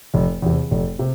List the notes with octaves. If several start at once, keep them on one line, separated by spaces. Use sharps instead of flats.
F1
E2 C3
F1
C3